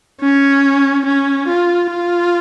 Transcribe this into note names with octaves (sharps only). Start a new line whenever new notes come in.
C#4
C#4
F4
F4